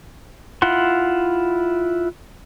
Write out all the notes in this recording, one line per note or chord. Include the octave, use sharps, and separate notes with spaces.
E4 F4 F#5 C6